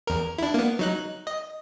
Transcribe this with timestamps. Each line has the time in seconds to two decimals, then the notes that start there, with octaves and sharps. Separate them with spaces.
0.07 E2 A#4
0.38 D4 E4
0.54 A#3 B3
0.79 F#3 D#4 F#6
1.27 D#5